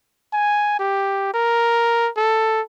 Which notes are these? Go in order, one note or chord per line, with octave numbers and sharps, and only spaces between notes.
G#5
G4
A#4
A4